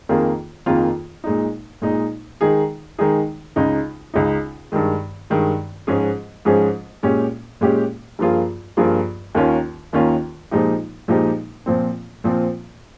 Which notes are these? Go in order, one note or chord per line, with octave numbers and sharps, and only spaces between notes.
F2 D#3 A#3 F4 G#4
F2 D#3 A#3 F4 G#4
A#2 G#3 D#4
A#2 G#3 D#4
D#3 G#3 D#4 G#4
D#3 G#3 D#4 G#4
C#2 C#3 G#3 D#4
C#2 C#3 G#3 D#4
G2 D#3 G#3
G2 D#3 G#3
G#2 F3 G#3 C#4 G#4
G#2 F3 G#3 C#4 G#4
A#2 G#3 C#4 G4
A#2 G#3 C#4 G4
G2 F3 A#3 F4 G#4
G2 F3 A#3 F4 G#4
D#2 D#3 A#3 C#4 F4
D#2 D#3 A#3 C#4 F4
A#2 F3 G#3 D#4 G4
A#2 F3 G#3 D#4 G4
A#2 F3 C4
A#2 F3 C4